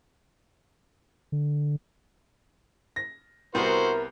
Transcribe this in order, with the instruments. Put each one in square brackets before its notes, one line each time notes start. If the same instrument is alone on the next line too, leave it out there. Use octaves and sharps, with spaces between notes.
[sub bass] D3
[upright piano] A#6
[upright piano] C2 B3 C4 [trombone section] E4 A#4 [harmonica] F#4 C5